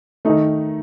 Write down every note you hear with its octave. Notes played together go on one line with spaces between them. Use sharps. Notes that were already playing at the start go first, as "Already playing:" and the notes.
D#3 A3 D#4